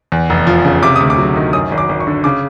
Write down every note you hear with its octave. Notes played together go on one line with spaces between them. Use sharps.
E2
F1
F3
C#3
C3 D6
D2 D#6
D6
F#3
D#3
F#2 D#6
G#1
D6
G#1
C#6
D3
C#3 D6